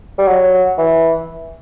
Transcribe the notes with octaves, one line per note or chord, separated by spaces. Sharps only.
G3
F#3
E3